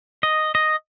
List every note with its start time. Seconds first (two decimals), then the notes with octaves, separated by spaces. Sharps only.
0.23 D#5
0.55 D#5